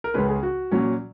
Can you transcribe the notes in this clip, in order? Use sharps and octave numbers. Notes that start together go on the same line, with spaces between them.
A#4
C#2 C#3 G#3 C#4 B4
G#4
F#4
A#2 F#3 C#4